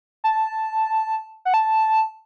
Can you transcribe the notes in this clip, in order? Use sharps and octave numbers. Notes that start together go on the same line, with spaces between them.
A5
F#5
A5